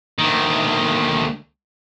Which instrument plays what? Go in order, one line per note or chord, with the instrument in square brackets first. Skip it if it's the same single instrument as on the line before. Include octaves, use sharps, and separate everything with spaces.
[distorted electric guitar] D2 D#3